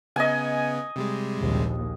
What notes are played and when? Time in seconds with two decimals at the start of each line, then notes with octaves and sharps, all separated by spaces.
0.16 C#3 B3 D#5 G#5
0.96 C3 G3 G#3
1.39 A#1 D#2